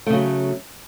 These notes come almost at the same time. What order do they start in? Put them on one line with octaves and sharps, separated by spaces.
A3 C#3 F#3